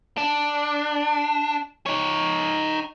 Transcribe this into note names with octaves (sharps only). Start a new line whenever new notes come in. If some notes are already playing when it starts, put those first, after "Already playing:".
D4
D#4 C#5